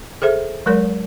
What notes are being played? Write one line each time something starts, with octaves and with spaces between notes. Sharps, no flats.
G#4 A4 C5 E5
F#3 G#3 A#4 C#5